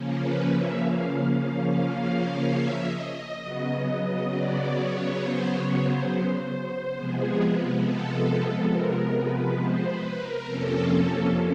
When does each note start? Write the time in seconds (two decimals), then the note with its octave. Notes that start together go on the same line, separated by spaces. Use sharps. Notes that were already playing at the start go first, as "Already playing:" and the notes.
Already playing: C#3 F3 A#3 C#4
0.21 B4
0.49 E5
0.79 F5
2.56 E5
2.85 D#5
3.13 D#5
3.43 C#3 F#3 B3
4.31 D5
4.75 C#5
5.19 C5
5.49 C#5
5.78 C5
6.95 C3 F3 G#3 B3 G#4
7.83 A4
8.72 A#4
9.15 B4
9.59 C5
9.89 B4
10.18 A#4
10.47 F2 C3 F3 A#3 C#4 A4